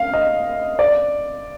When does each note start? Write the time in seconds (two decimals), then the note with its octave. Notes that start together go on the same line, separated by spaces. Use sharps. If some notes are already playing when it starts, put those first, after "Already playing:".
Already playing: F5
0.14 D#5
0.79 D5